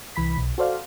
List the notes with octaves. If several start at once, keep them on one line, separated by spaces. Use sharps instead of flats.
C2 E3 B5 B6
B1
F#4 A4 C5 D5 F5